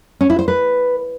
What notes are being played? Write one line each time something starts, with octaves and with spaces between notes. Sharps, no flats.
C#4
E4
C5
B4